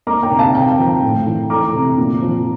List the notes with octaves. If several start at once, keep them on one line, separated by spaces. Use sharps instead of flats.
A#3 A#5 D6
G5 A#5
C3
F5 A5
C3 G5 A#5
F3
A2
E3
A3 A#5 D6
C3
A#2
F3